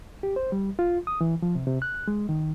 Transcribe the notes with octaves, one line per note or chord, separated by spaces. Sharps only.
G4
C5
G3
F4
D#6
E3
F3
C3
C3
F#6
G#3
D#3